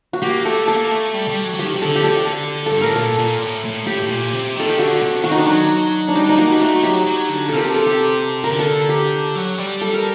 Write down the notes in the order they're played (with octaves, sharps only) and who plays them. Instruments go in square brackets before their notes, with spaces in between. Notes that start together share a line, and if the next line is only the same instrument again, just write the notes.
[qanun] F#4
[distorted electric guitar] A#3 [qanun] G4
[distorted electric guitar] A3 [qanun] A4
[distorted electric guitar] A#3 [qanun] A4
[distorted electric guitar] A3
G3
G3
F#3
F#3
[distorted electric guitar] D#3 [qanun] G4
[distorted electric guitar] C3
[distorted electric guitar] D3 [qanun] A4
[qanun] G4
[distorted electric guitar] D3 [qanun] A4
[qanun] G4
A4
[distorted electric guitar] G2 [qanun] A4
[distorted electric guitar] A2 [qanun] A#4
[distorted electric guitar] A#2 [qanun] A4
[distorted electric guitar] A#2
A2
A2
[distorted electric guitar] A2 [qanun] G4
[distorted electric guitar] A2
A#2
C3
[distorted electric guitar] D#3 [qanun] A4
[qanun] G4
[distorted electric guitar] D3 [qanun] F#4
[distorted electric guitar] C3
[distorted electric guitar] D#3 [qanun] F#4
[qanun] D#4
D4
[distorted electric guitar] F#3 [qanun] D#4
[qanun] D4
[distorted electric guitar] G3 [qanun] D#4
[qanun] D#4
[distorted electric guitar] A#3 [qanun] F#4
[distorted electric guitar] G3 [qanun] D#4
[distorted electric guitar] A3 [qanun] F#4
[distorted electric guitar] F#3 [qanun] G4
[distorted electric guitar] F#3
D3
[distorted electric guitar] C3 [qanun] A4 A#4
[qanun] G4
A4
A4
G4
[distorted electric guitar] D3 [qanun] A#4
[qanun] A4
G4
[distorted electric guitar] F#3
G3
[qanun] A4
A#4